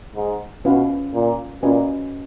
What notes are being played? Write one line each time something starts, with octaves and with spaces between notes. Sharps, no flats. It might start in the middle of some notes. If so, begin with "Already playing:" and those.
G#2
B2 C#4 F4 B4 F5
A#2
A#2 C#4 F#4 B4 D#5 G#5